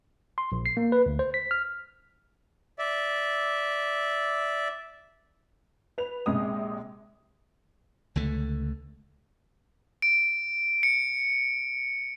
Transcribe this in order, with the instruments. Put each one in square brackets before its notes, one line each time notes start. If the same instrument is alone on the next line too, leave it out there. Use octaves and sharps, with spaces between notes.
[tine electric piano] C6
A#1
C7
A#3
B4
D2
C5
B6
F6
[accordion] D5 E5
[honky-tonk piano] B4 F7
A#1 C3 G#3 D#6
[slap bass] C#2 D3 A3
[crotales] D7
C#7